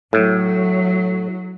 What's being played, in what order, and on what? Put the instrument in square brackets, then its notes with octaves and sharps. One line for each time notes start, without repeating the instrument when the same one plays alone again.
[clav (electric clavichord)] A2 [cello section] F#3